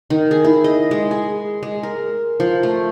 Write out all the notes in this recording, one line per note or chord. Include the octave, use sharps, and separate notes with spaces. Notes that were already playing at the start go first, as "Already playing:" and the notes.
D#3
G#4
E4
D#5
G#3
G#4
G#3
A#4
F3
A3